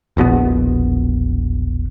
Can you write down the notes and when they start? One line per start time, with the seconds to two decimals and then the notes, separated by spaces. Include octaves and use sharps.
0.17 E1 A#1 B2 B3